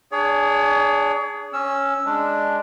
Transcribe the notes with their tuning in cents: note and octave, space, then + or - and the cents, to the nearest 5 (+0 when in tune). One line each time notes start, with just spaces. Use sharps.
D4 +10 G#4 +0 C#5 +45
C#4 -5 E6 +0
G#3 +0 D4 +0